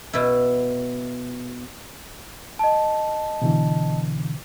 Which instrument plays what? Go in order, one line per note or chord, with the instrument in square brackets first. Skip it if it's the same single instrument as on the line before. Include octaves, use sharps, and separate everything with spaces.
[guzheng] B2 E4
[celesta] D#5 A5
[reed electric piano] B2 D3 E3